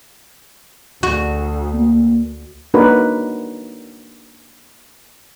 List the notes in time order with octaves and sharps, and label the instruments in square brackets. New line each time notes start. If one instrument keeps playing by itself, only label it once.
[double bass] D2 [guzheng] F#4
[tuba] A#3
[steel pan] A#3 D4 D#4 F#4 A#4 B4